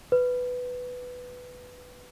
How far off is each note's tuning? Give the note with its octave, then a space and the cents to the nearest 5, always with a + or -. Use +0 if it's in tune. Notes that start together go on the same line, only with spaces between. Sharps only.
B4 +5